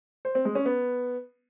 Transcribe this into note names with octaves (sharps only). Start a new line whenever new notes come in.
C5
C4
G#3
C#4
B3